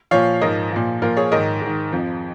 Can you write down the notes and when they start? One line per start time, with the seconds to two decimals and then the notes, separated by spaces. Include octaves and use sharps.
0.11 A#2 F3 C#5 F5
0.41 G#2 F3 A#4 D#5
0.71 A#2 F3
1.02 A#2 F3 F4 A#4
1.17 G#4 C#5
1.32 G#2 D#3 A#4 D#5
1.61 G#2 D#3
1.92 F2 F3